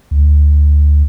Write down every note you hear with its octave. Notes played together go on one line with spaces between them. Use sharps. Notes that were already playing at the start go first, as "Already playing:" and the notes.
D2